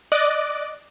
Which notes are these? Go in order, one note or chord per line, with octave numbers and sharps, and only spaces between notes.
D5 D#5 D6 F#6